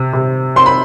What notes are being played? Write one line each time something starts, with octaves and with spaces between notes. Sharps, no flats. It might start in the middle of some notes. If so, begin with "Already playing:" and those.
Already playing: C3
C3
C4 C6
B5